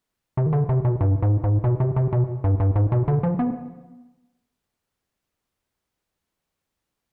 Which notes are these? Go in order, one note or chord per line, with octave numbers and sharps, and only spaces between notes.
C3
D#3
D3
C3
B2
G2
G#2
G#2
B2
C3
C3
B2
G2
G2
G#2
B2
D3
F3
B3